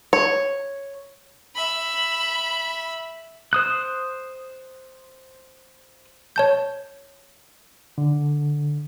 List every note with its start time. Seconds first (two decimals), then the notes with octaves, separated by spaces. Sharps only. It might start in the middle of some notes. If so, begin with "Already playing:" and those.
0.13 C#5
1.55 E5 B5
3.53 C5 D#6 F#6
6.36 C#5 A5 G6
7.98 D3